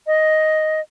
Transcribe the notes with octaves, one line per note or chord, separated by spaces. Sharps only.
D#5